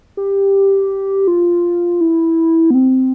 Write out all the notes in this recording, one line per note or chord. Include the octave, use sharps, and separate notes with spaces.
G4
F4
E4
B3
C4